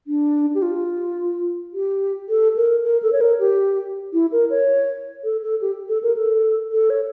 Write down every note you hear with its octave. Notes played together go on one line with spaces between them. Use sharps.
D4
G4
F4
G4
A4
A#4
A#4
A4
C#5
A#4
G4
E4
A#4
C#5
A4
A4
G4
A4
A#4
A4
A4
C#5